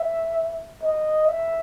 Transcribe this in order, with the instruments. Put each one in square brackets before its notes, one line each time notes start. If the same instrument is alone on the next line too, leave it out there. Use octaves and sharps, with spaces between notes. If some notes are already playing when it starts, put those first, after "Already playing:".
Already playing: [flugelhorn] E5
D#5
E5